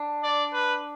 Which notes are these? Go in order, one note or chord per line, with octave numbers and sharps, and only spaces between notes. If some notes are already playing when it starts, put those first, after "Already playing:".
Already playing: D4
D5
B4